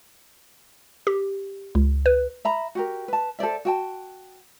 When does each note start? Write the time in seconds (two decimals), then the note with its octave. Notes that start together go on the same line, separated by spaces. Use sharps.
1.07 G4
1.75 C#2
2.06 B4
2.45 E5 A#5 B5
2.75 F#4 G4 A#4
3.08 B4 A5
3.39 A4 C5 D5 E5
3.65 F#4 G5 A5